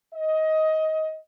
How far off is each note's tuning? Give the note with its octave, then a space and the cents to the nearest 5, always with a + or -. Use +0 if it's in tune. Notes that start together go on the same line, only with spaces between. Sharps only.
D#5 +20